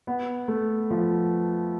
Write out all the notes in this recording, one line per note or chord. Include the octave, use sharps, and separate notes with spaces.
B3
A3
F3